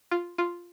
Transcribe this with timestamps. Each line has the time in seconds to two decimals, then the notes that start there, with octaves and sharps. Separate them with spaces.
0.11 F4
0.38 F4